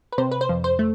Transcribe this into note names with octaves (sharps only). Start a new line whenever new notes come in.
B4
C3 C5
B4
C5
F2
C5
A3